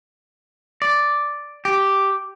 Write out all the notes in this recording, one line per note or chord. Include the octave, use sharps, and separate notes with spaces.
D5
G4